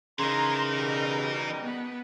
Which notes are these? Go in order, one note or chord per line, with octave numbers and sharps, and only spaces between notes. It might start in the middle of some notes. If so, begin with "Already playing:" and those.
C#3 E3 D#4 A#4 A#5 C6
B2 G3
B3